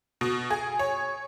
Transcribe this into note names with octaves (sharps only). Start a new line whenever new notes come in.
B2
G#4
C#5